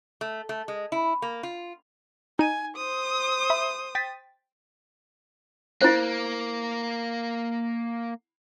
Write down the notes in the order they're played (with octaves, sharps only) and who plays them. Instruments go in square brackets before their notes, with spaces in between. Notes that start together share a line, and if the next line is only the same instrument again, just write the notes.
[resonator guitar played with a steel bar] A3
A3
G#3
E4
A#3
F4
[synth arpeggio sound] D#4 D#7 [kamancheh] G#5
[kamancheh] C5 D#6
[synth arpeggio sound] E5 B5
G5 A6 B6
[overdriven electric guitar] A#3 [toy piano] E4 C5